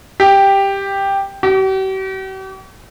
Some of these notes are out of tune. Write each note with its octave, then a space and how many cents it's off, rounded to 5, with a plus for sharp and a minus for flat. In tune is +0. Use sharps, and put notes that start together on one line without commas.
G4 +5
G4 -45